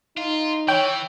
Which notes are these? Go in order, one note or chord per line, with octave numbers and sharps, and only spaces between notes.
D#4 F4
E3 C#5 G5